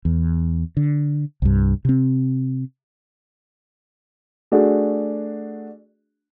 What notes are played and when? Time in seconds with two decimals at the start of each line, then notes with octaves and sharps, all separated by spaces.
0.05 E2
0.77 D3
1.42 C2 G2
1.85 C3 C4
4.52 A3 D4 F#4 G#4